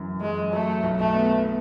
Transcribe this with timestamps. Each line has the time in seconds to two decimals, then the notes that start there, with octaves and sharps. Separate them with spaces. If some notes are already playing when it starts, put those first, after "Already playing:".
Already playing: F#2 E3
0.21 F#2 G#3
0.52 F#3 A3
0.83 B1
0.99 A3
1.14 B3
1.45 B3